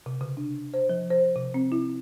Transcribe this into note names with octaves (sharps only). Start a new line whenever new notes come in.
C3
C#3
D4
C5
F3
C5
C3
C4
E4